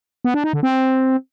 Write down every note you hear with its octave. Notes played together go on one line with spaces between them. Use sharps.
B3
D4
D#4
D3
C4